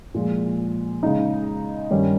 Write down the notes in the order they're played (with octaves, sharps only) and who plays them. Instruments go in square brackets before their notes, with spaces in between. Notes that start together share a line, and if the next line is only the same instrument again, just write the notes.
[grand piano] A#2 F3 G#3
C#3 G#3 D#4
G2 D#3 G3 C#4